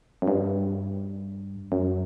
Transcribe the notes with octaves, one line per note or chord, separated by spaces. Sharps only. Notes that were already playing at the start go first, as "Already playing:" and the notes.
F#2
G2
F#2